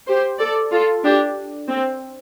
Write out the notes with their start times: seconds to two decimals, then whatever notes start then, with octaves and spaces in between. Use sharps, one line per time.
0.08 G4 C5
0.39 A4 D5
0.71 F4 A4
1.04 D4 G4
1.68 C4